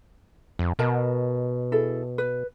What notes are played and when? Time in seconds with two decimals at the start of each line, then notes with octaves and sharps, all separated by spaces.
0.59 F2
0.79 B2 A#4 D#5 A5
1.72 E4 G#4 A4
2.18 B4